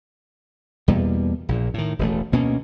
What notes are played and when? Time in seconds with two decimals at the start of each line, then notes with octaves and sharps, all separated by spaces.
0.88 E2 B2 G3 A#3
1.49 A#1 A#2
1.74 A2 D#3
1.99 E1 A1 A3
2.32 D2 B2 A#3 C#4